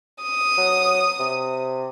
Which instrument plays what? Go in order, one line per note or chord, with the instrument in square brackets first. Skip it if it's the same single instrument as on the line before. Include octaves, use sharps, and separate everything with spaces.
[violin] D#6
[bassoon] F#3
C3